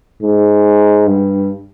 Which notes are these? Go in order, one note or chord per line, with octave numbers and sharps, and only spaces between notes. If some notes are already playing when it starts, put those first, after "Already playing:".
G#2
G2